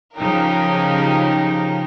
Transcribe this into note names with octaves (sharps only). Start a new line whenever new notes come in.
C#3 F3 D#4 G4 A#4